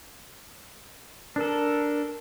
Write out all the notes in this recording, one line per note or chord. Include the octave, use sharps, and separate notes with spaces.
D4 A4 A#4